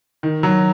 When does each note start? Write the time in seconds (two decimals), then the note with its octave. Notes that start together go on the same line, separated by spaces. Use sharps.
0.23 D#3
0.43 F#3